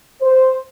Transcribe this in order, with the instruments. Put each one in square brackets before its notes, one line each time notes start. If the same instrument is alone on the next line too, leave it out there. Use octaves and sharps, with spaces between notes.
[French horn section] C5